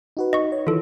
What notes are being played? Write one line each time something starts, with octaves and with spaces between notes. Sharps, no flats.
D#4 F#4 B4
D#5 C#6
C#5
D#3 E3 F4 A4